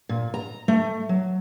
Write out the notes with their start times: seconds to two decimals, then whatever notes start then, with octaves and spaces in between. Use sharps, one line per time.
0.09 A#2
0.34 A#5
0.68 A3
1.09 F#3